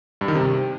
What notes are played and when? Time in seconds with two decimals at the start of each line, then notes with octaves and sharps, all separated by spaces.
0.21 G2
0.28 D#3
0.35 C3